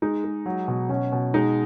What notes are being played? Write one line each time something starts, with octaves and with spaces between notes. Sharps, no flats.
G#3 D#4
G#3
F#3
B2
B2 C#4
B2
G#3 D#4